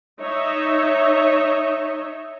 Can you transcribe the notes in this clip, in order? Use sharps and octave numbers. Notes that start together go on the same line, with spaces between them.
D#4 C#5 D#5 E5